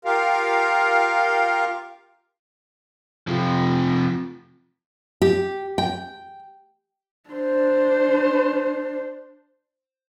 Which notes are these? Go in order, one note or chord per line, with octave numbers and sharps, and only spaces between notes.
F4 G4 A#4 F5
C3 F3
G4
G5
D4 C5